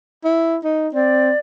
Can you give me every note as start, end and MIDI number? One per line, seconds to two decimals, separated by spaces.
0.25 0.57 64
0.64 0.88 63
0.94 1.31 60
0.94 1.39 74